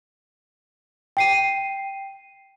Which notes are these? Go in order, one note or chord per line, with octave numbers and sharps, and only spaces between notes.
G5 C7 D#7